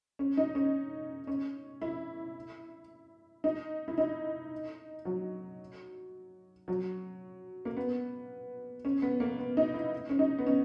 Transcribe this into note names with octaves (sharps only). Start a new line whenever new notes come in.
C#4
D#4
C#4
C#4
E4
D#4
E4
D#4
F#3
F#3
A#3
B3
C#4
B3
A#3
B3
D#4
E4
C#4
D#4
B3
C#4